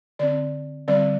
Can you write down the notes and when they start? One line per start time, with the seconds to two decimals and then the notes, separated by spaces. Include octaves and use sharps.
0.19 D3 C4 D5
0.88 D3 G3 C4 D5